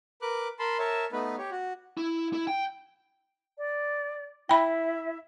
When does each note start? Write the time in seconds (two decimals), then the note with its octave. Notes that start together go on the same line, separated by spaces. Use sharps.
0.22 A#4 B4 D6 F#6
0.59 A#4 A5 B5 C6
0.79 A#4 C#5 E5 A5
1.12 A3 B3 D#4 B4
1.38 G4 C#5
1.51 F#4
1.97 E4
2.33 E4
2.47 G5
3.58 D5
4.49 E4 E5 G5 B5